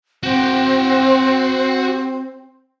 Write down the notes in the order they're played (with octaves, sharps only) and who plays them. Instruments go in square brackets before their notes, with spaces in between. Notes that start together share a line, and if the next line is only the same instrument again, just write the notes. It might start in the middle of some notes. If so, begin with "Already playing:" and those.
[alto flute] C4 [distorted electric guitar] F#4 G5